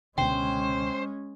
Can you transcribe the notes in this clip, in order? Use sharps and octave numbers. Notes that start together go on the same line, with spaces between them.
C#2 B2 D3 G#3 C#4 C5 G5